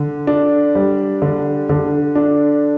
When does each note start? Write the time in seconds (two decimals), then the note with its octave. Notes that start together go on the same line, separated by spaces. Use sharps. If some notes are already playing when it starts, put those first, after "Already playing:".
Already playing: D3
0.27 D4
0.75 G3
1.22 D3
1.69 D3
2.15 D4